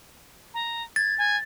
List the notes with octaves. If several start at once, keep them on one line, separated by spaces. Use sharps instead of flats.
A#5
G#6 A6
G#5